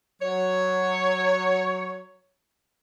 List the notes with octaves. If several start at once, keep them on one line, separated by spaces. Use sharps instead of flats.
F#3 C#5